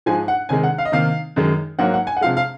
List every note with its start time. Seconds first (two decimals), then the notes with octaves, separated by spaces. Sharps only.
0.06 G#2 F3 G#3 G#5
0.28 F#5
0.49 C3 D#3 G#3 G#5
0.63 F#5
0.78 F5
0.85 D#5
0.92 C3 D#3 A#3 F5
1.36 F#2 D#3 G#3
1.79 G#2 F#3 A#3 F#5
1.94 F#5
2.07 G#5
2.17 F#5
2.21 C3 F3 G#3 F5
2.37 F5